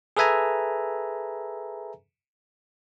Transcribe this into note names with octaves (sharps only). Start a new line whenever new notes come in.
G#4 A4 B4 E5 G#5 A#5